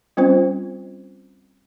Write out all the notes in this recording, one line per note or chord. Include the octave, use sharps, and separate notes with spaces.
G3 C4 C#4 F4 C5